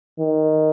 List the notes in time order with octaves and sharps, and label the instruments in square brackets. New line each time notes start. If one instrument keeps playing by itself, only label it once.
[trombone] D#3